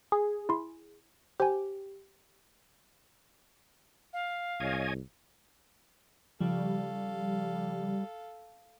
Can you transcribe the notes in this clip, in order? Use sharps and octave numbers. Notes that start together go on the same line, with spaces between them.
G#4
E4 C6
G4 C5 G#5
F5
C2 C#5 D#5 G#5
C#3 F3 G3 A4 F5